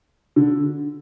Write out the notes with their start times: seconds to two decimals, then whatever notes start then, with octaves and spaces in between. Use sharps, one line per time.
0.36 D3